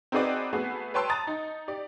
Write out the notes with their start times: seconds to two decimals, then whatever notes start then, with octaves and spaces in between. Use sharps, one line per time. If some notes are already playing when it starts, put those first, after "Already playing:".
0.12 C4 D#4 F#4 G#4 B4 D5
0.53 A3 B3 F#4 G#4
0.94 B4 C#5 G5 A5 C6 E6
1.09 A5 A#5 D#6 A6
1.27 D#4
1.68 G4 D5